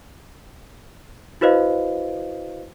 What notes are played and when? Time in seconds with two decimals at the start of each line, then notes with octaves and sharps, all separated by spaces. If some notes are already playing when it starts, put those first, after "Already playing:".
1.41 E4 F#4 B4 C5 D#5 F5